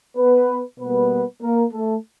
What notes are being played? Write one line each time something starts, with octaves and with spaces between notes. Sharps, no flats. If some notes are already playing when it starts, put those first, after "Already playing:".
B3 B4
B2 G3 A#3 B3 B4
A#3 A#4
A3 A4